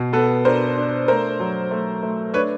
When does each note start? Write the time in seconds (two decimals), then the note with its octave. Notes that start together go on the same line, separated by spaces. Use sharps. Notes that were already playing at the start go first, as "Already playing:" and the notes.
Already playing: B2
0.13 B3 A4 B4
0.45 D4 A#4 C5
0.77 D4
1.08 A3 A#4 C5
1.40 F#3
1.71 A3
2.03 A3
2.34 D4 B4 C#5